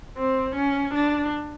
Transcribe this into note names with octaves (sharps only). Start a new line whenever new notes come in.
C4
C#4
D4